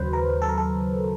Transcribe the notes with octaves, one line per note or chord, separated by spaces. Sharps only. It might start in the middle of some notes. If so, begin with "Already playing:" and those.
Already playing: D#2 C#3 F#3 B4 C5
A#4
A4
A#4
A4